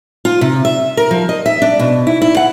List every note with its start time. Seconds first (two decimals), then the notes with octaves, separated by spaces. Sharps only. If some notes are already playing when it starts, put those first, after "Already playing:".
0.25 F4
0.41 C3
0.65 E5
0.97 A#4
1.11 F3
1.29 D#5
1.46 E5
1.62 D4
1.79 B2
2.07 E4
2.22 E4
2.37 F#5